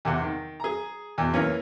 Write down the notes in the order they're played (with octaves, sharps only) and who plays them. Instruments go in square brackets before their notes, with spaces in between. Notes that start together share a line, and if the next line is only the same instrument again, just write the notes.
[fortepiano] E2 C3 F#5
D#3
G#4 A#5
E2 B2
E3 A#3 C#4 C#5